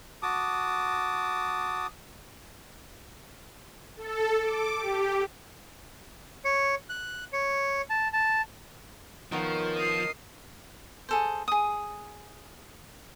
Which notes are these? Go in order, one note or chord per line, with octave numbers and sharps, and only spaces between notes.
F#4 A5 D6 D#6
A4
D6
G4
C#5
F#6
C#5
A5
A5
D#3 F3 B3 A#4 C#5 D#5
D#5 D#6 C7
G#4 A4 C5
G#4 D#6